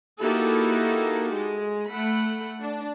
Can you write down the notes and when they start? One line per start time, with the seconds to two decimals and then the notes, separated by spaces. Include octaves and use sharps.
0.21 A#3 D#4 E4 F#4 G4 A4
1.33 G#3
1.88 A3 F#5 B5
2.61 D4